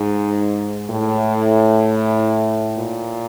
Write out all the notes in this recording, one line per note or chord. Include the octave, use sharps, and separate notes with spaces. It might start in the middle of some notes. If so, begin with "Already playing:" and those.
Already playing: G#2
A2
A#2